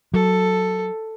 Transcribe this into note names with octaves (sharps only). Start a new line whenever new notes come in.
F#3 A4